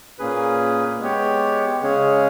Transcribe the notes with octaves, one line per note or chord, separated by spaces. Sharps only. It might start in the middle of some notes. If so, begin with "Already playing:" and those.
A#2 A#3 C#4 G#4 B4
G#3 B3 G4 C#5
C#3 G#3 C#4 G#4 C#5